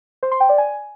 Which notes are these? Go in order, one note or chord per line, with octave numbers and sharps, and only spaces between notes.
C5
C6
G5
D5
G#5